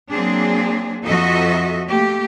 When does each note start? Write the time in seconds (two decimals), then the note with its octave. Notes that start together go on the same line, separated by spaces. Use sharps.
0.11 F#3 A#3 C4 D4 G#4
1.05 F2 F3 F#4 A4 D#5 E5
1.87 A3 A#3 G4